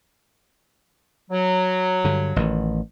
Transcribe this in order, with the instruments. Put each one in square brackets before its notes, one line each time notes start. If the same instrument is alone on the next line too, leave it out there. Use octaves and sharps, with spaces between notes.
[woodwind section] F#3
[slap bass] G2 D3
A1 D#3